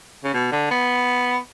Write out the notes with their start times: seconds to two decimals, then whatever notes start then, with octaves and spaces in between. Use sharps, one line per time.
0.24 C#3
0.33 B2
0.52 D3
0.71 B3